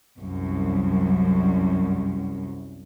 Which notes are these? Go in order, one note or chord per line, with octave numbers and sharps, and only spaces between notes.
C2 F#2